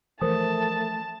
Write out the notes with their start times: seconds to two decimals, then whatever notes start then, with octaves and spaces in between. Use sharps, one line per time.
0.21 E3 F3 A3 A#4 C5 A5 D#6